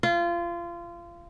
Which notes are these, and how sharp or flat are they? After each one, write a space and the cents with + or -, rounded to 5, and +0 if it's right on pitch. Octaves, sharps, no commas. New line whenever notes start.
F4 -25